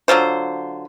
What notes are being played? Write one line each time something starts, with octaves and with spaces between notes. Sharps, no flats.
D3 F#3 F4 C5